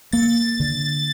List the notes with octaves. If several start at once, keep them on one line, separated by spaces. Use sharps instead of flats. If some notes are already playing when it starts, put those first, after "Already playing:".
A#3 A6
D3